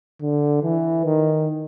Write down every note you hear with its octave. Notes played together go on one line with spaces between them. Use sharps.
D3
E3
D#3